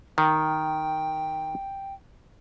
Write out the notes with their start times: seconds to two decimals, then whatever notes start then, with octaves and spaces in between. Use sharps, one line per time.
0.18 D#3 G5